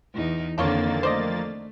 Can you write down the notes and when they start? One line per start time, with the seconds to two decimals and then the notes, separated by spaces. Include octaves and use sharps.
0.14 E2 D#4
0.58 F2 D3 D#3 A#3 D4 F4 C#5 A6
1.03 A3 C5 D5 D#5